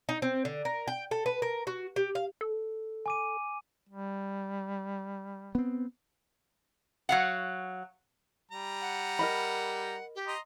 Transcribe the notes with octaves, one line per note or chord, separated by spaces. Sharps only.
D#4
C4
D3
A#4
G5
A4
B4
A#4
F#4
G4
F5
A4
G#5 D6 D#7
G3
B3 C4
F#3 F5 F#5
G3 A#5
F#5
A#4 D#5 B5
G4
D#5 A#5 C6